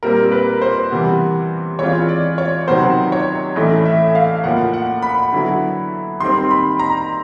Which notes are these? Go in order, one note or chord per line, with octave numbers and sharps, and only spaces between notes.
A#2 G3 C4 A#4
B4
C5
C3 E3 G3 B3
E3 G#3 C4 F4 C#5
D5
C#5
C3 D#3 F#3 B3 C5
C#5
A2 E3 A3 C#4 D#5
E5
F5
A2 F3 A#3 F#5
F#5
B5
D3 F#3 B3 E4
D#3 G3 C4 C6
B5
A#5